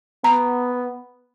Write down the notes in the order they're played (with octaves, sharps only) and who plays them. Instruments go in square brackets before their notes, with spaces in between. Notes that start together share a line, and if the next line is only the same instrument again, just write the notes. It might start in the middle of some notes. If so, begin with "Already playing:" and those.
[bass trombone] B3 [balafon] A#5